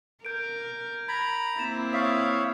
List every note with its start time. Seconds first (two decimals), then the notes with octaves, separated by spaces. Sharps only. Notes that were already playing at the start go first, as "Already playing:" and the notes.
0.25 A#4 G6 D7
1.09 A#5 B5 G#6
1.58 A#3 C4 E4 A6 E7
1.93 C#5 E5 F5 D#6 A6